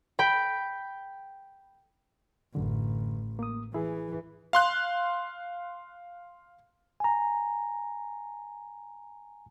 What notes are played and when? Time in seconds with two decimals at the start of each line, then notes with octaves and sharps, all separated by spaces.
0.19 G5 B5
2.55 A1 F#2 D3
3.39 A#3 D#6
3.74 E3 E4 G#4
4.53 F5 C6 F#6
7.00 G#5 A#5